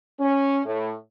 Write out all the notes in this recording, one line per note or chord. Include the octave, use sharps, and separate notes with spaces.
C#4
A2